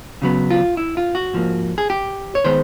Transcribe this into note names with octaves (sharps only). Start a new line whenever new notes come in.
C#3 F#3 B3
F4
E4
F4
F#4
G#2 F3 A#3
G#4
G4
C#5
D#3 G#3 B3 C5